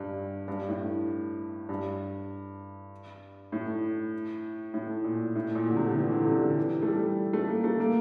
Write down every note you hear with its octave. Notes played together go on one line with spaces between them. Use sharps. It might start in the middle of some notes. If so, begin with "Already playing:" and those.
Already playing: G2
G2
A2
G2
A2
A2
A#2
A2
A#2
D3
C3
D3
E3
D3
C3
D3
E3
A3
G3
A3
A#3
A3
A#3